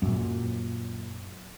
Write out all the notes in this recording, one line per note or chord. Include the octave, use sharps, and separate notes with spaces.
F#2 A#2